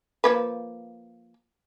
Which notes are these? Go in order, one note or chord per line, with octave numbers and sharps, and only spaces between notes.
F3 A#3 B4